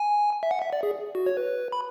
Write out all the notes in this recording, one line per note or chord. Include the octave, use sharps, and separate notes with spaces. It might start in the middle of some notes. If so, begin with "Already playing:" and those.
Already playing: G#5
E5
F#5
E5
D5
G#4
F#4
C#5
B4
B5